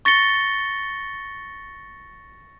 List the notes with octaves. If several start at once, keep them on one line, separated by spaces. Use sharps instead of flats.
C#6 A6 A#6 C#7 G7